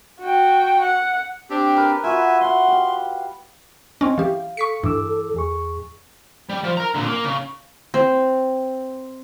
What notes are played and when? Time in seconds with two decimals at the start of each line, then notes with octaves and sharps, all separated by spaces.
0.21 F#4 G5
0.83 F#5
1.50 C4 D4 G4
1.76 A#4 B4
2.04 F4 F#4 B4 E5 G#5
2.41 E5 F#5 C6
2.68 G4 F5
4.01 C4 C#4 D#5
4.18 E3 G4 F5
4.57 A4 C#6 B6 C#7
4.84 G2 E3 D6 E6
5.35 E2 G#4 C#6
6.49 G3
6.64 F3
6.77 A#4 A#5
6.95 A#2 D3
7.08 A#3
7.25 C#3
7.94 C4